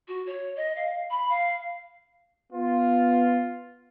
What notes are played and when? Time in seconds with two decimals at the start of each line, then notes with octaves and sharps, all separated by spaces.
0.07 F#4
0.26 C#5
0.56 D#5
0.76 F5
1.10 B5
1.29 F5
2.52 B3 F4